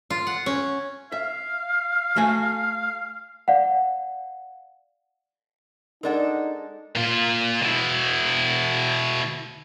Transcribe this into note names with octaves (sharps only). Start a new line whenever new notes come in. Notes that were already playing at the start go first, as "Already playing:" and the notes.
F4
F#5
C#4
E5 F5
A3 F#4 G#5
D5 F5 F#5
G#3 D4 D#4 A4 A#4 D5 F#5
A#2 F4
B2 E4